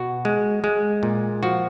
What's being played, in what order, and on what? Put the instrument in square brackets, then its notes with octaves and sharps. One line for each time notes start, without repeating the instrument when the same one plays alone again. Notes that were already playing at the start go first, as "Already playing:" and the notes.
Already playing: [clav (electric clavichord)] B2 F#4
G#3
G#3
A#2
F3 F#4